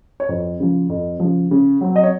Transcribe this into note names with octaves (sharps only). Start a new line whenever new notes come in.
C#5
F2 C5
C#3 F3
F2
C#3 F3
C#3
F#3 C4
D#5
C#5